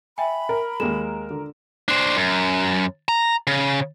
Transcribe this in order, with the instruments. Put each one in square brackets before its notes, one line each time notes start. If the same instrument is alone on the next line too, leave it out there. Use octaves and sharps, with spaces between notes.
[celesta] E5 G5 G#5 [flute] B5
[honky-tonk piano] A#4
[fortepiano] D#2 G#3 [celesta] E7
[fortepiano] D3
[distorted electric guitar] D4 C5
F#2
A#5
C#3